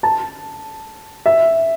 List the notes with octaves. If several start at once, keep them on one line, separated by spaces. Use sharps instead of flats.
A5
E5